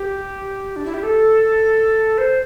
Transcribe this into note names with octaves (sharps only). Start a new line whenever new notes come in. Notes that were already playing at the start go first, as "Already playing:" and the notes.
Already playing: G4
D4
E4
G4
A4
C5